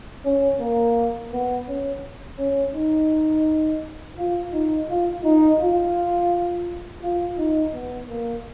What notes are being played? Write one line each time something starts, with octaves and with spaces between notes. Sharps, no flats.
C#4
A#3
B3
C#4
C#4
D#4
F4
D#4
F4
D#4
F4
F4
D#4
B3
A#3